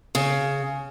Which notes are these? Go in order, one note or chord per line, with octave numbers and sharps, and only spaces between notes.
C#3